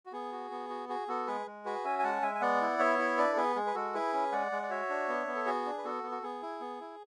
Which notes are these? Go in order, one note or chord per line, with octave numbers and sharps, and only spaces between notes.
F#4
B3 G#4
F#4
B3
F#4
F#4 G#4
B3 F#4 A4
G#3 G#4 B4
G#3
F#4 G#4 B4
C#4 E5 G#5
G#5
G#3 F#5 A5
G#3 E5 G#5
G#5
B3 D5 F#5
E4
B3 C#5 E5
E4
D4 B4 D5
A4
B3 G#4 B4
G#3 G#4
B4
G#3 F#4 A4
E4 G#4 B4
C#4
G#3 D5 F#5
G#3
D5
F#4 C#5 E5
D4
B3
B3
A4
F#4 G#4
D4
B4
B3 F#4 A4
B3
F#4
B3 G#4
E4
B3
E4